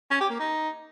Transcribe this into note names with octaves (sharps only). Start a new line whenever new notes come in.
C#4
G4
A#3
D#4